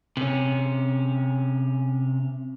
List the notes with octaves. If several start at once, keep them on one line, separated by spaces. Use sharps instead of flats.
C3 C#4